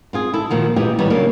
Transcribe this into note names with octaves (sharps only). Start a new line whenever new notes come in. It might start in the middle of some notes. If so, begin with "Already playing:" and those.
C4 F4 G#4
E4 A4
A#2 D#3 F3 F#4
A#2 E3 D#4 G4 G#4
D#3 G3 B3 D#4 B4 C#5
C#3 F#3 G3 A#3 D4